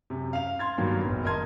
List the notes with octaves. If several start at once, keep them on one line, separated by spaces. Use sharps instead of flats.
F#2 C3
F5 F7
C6 G#6 A6
G2 D#3 F#3 A#3 B3
F#1 B2
A#4 D#5 A5 C6 G#6